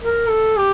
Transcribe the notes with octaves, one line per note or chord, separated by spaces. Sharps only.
A#4
A4
G4